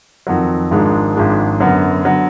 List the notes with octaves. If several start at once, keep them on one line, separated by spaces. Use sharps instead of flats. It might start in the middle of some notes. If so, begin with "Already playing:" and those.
F2 D#3 F#3
G#1 G#2 F3 G#3 D4
G#1 G#2 F3 G#3 D4
F#2 D3 F#3 B3
D3 F#3 B3